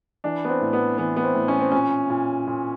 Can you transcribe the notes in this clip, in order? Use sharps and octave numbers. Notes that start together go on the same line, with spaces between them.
E3 D4
B3
C4
A2
B3
E3 B3
B3
C4
A2
C#4
C4
A#2 C#4
A#2
A#2